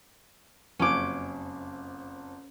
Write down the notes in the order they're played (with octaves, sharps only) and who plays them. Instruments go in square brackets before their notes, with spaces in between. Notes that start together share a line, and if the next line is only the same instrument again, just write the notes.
[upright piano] F#1 F2 [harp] C#4 D6